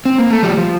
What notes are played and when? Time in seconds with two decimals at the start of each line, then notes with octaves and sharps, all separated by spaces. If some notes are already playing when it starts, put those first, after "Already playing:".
0.06 C4
0.18 A#3
0.30 A3
0.43 F3 G3
0.57 F3